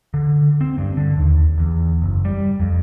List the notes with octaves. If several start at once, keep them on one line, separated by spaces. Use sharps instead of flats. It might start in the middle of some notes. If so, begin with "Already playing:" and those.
D3
C4
G2
D3
D#2
E2
F#1
G3
F2